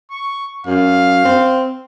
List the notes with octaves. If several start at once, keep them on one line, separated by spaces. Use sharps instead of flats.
C#6
F#2 F5
C4